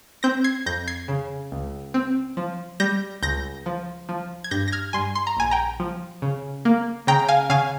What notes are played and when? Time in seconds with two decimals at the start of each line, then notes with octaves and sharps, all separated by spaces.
0.23 C4 G6 A#6
0.44 G#6 C7
0.66 F2 G6 A#6
0.87 G#6 C7
1.08 C#3
1.52 C#2
1.94 C4
2.37 F3
2.80 G3 G6 A#6
3.23 C#2 G6 A#6
3.66 F3
4.09 F3
4.44 G#6
4.51 G2 G6 A#6
4.68 A#6
4.72 F6 G#6
4.93 G2 G#5 C6
5.15 C6
5.27 A#5
5.37 A#1 G#5
5.51 G5 A#5
5.80 F3
6.22 C#3
6.65 A#3
7.07 C#3 G5 A#5
7.28 F5 G#5
7.50 C#3 F5 G#5